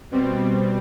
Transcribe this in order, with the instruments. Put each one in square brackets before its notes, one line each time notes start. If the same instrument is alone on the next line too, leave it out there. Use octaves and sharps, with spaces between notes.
[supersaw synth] B2 G3 C4